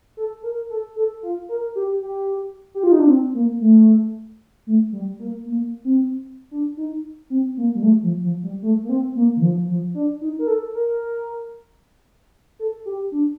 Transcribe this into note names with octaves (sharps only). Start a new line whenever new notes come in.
A4
A#4
A4
A4
F4
A#4
G4
G4
G4
F4
D#4
D4
C4
A#3
A3
A3
G3
A#3
A#3
C4
D4
D#4
C4
A#3
G3
A3
F3
F3
G3
A3
A#3
C4
A#3
D#3
F3
F3
D4
D#4
A#4
A4
A#4
A4
G4
D4